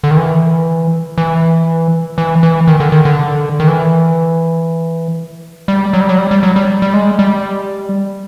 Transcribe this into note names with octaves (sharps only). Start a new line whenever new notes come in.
D3
D#3
E3
E3
E3
E3
D#3
D3
D#3
D3
D#3
E3
G3
F#3
G3
F#3
G3
G3
F#3
G3
G3
G#3
G3